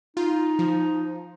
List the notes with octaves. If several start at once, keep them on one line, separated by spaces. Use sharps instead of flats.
D#4 F4
F3